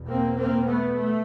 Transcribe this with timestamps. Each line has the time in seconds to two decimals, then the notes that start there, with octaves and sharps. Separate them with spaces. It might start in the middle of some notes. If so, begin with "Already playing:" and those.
Already playing: E2 B2
0.08 A#3 C4
0.36 A#3 C4
0.66 A3 B3
0.94 A3